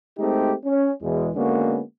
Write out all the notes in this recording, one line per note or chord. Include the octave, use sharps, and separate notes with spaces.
G#3 A3 C4 D#4 G4
C#4
E2 B2 E3 G#3
D3 G#3 A#3 B3 C#4 F#4